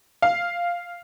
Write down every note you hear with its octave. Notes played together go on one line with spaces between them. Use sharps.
F5